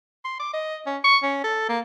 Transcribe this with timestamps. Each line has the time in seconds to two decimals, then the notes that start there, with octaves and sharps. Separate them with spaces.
0.25 C6
0.40 D6
0.53 D#5
0.86 C#4
1.04 C#6
1.23 C#4
1.44 A4
1.69 A#3